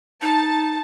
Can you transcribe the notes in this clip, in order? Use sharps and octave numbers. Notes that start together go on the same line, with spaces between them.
D#4 A5